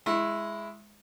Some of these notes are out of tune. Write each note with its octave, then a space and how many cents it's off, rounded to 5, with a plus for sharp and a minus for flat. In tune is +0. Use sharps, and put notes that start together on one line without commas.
G#3 +0 E4 +10 C#6 -40